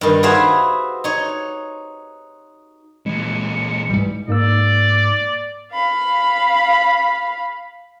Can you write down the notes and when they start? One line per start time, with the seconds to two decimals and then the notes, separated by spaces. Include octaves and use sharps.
0.01 G2 D#3
0.23 F#4 G#4 B4 C5 E5 F5
1.04 D#4 C#5
3.06 A#2 E3 G#3 C#7
3.90 G#2 B2 E3 G3
4.28 G#2 A#3 D5 E6
5.72 F5 B5